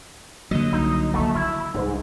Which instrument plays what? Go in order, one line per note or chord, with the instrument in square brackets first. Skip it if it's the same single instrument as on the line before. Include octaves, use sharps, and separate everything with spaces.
[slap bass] D3 F#3 [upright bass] A#3 [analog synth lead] D#5
[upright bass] C2 A#3 [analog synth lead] D#4
[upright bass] F3 A#3 [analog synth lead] A3
[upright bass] D#3 [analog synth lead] E4
[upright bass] C2 [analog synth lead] G#2